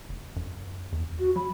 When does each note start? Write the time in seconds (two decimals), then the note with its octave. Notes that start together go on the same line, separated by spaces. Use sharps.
0.09 F#1
0.36 F#2
0.92 E2
1.19 F#4
1.36 F#3 B5